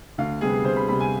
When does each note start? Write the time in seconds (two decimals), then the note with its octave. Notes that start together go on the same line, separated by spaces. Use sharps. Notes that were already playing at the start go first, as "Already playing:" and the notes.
0.18 D2 F5
0.41 C3 G3 B3 G#4
0.65 D2 C5
0.76 B5
0.88 C3 G3 B3 B5
1.00 G#5